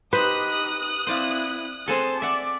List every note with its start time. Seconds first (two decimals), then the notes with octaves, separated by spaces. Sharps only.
0.13 D#4 G4 B4 C5 D#6 F#6
1.07 C4 E4 C5 D5 F5
1.88 C4 G#4 A4 C5 A5
2.22 D5 E5 F#5